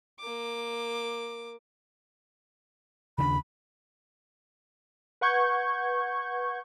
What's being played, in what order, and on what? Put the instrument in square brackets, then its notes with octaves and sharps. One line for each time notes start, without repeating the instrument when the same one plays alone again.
[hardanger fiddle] A#3 D6
[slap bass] D#2 C#3 D4 [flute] B5
[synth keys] B4 F#5 C#6 G6 G#6